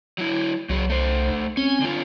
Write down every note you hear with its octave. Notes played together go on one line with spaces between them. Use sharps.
F#3 E4
C2 F#3 F#4 G#4
A3 C5
C4 C#4 G#5
D3 F4